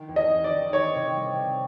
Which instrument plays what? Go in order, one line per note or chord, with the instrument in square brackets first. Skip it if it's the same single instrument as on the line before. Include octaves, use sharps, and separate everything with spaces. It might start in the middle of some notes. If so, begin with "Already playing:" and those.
Already playing: [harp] D#3
E2
[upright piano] D#5
[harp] E2
[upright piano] D5
[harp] D#3
[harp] D#3 [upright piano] C#5
[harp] C3
G3
C3